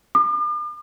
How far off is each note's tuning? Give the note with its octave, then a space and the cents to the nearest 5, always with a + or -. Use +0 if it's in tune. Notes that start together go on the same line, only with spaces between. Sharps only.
D6 +45